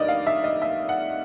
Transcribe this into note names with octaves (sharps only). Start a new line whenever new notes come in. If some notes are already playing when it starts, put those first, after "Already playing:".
Already playing: G2 D#3 D5 D#5
F5
E5
D#5
E5
F#5